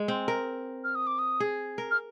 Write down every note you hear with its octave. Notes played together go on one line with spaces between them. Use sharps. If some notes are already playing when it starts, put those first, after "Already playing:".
Already playing: G#3
C4
A#4
F6
D#6
D6
D#6
G#4
A#4
F6